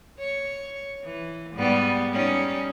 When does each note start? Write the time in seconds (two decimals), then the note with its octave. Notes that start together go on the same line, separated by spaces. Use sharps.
0.19 C#5
1.05 E3
1.54 G#2 G3 B3
2.13 G3 C#4 D#4